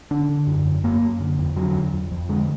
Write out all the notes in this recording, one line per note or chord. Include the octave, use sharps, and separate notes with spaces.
D3 D4
D3
F#2
F#2
F#2 A#3
F#2
D3
F2
D3 F#3
F2
F2
F2
D3 G#3